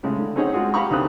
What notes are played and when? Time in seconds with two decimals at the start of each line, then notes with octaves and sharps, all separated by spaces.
0.03 A2 C#3 G#3
0.19 D3
0.36 C4 C#4 D#4 G#4 C#5 F#5
0.53 G#3 F4 F#4 G#4
0.74 G4 F5 A#5 B5 C#6
0.91 D2 D#3 C4 D#6 F#6